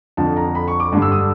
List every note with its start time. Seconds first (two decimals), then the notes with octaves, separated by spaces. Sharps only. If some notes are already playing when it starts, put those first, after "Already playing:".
0.17 F2 D3 F3 A5
0.37 A#5
0.55 B5
0.68 C#6
0.80 D6
0.92 G2 D3 G3
1.02 E6
1.12 D#6